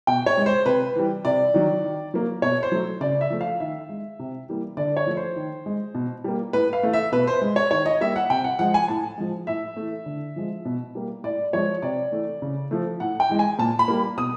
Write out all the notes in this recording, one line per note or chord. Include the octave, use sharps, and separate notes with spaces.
B2 G5
C#5
G#3
C5
C3 B4
E3 G3
C3 D5
D#3 F#3
D#3
F#3 A#3
B2 C#5
C5
F#3 A3
C#3 D5
E5
F3 A3
F5
D#3 E5
G#3
C3
E3 G3 A#3
D3 D5
C#5
F3 A3
C5
D#3
G#3
B2
G3 A#3
A2 B4
F5
E3 A3
E5
B2 B4
C5
G#3
C#5
D#3 C#5
D#5
G3 A#3 E5
F#5
C3 G5
F#5
F3 G#3 F#5
G#5
A2 A5
F3 G#3
A2 E5
E3 A3
D3
F3 G#3
B2
G3 A#3
A2 D5
F3 G#3 C#5
C3 D5
E3 A3
C#3
F3 A3
A2 F#5
G5
E3 G#3
G#5
A#2 A5
B5
G3 A#3
B2 D#6